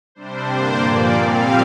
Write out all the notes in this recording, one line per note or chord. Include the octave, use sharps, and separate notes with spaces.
C3 G3 D4 C5
G2 D3 A#3 D4
A#2 F3 A#3 D5
A#2 G3 C4 F5